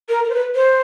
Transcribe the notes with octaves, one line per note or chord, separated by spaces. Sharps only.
A#4
A#4
C5
B4
C5